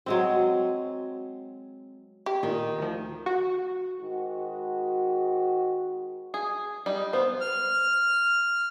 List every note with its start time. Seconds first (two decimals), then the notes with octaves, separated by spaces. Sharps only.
0.06 F#3 G#3 C4
2.26 G4
2.43 A#2 D#3
2.78 D2 F3
3.26 F#4
4.00 G#2 D#3 F#4
6.34 G#4
6.86 G3 D#4
7.13 B3 C5
7.41 F6